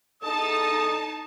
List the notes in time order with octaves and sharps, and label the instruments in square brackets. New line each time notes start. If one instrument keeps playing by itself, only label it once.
[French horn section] E2 A4 [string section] D#4 A5 [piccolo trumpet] D#6